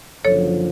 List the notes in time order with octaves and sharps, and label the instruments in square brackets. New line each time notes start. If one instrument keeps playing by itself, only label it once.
[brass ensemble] F#1 F#2 D3 F3 [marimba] A4 C#5